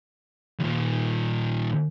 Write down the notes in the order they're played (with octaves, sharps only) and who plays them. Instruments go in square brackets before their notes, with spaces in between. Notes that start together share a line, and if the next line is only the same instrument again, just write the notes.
[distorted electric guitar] D#2 A#2